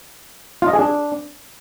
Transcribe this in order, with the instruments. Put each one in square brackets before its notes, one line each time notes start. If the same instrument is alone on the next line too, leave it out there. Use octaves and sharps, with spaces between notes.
[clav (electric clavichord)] F4
D#5
G#4
D4